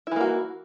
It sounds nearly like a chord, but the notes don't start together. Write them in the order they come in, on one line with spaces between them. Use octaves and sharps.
E4 E3 A#3 F#4